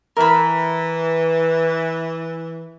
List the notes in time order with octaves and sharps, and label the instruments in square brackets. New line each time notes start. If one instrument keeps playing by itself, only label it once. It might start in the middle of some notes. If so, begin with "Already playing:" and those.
[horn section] E3 [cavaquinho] A#4 B5